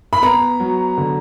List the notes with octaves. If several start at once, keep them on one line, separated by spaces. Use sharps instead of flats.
B5
B3 A#5
F#3
D3